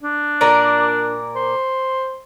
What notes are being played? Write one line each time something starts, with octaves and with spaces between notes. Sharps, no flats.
D4
A#2 A#4 D5
C5